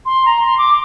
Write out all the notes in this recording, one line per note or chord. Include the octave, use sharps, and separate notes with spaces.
C6
A#5
C6
D6